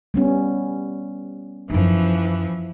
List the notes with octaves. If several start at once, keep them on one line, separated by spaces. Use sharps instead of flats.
G3 B3 C#4
F#2 E3 F3 D#4